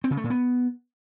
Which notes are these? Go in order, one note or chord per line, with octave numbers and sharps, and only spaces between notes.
C4
C#3
A3
A#2
B3